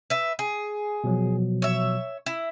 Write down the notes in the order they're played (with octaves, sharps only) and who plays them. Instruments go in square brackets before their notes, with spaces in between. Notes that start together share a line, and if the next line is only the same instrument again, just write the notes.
[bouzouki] B4 E5
G#4
[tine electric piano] B2 F3 F#3
[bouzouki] C#5 E5
E4